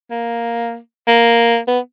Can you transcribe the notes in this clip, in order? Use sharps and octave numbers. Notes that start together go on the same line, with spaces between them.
A#3
A#3
B3